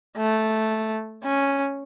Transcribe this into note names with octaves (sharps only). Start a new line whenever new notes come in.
A3
C#4